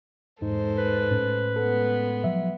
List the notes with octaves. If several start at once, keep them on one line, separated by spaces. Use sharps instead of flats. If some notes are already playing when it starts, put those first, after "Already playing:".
E2 G#2 G#3 D#4 A4 C5
B4
A2 C#4
G#3 B3 A4
F3 F#3 E5